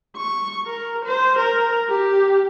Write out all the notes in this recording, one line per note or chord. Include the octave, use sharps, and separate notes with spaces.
C#6
A#4
C5
A#4
G4